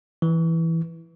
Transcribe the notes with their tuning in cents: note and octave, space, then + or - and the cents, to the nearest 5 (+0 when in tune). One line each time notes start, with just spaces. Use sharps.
E3 -5